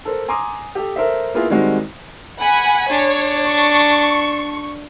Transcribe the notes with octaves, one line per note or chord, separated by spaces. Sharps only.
A4 A#4 C5
G#5 A#5 C6 D6 D#6
G4 A4
A4 A#4 C5 E5
A#3 B3 E4 F4 G#4 A#4
D#3 G3 G#3 C4 F#4
F#5 G#5 B5
D4 C#5
C#6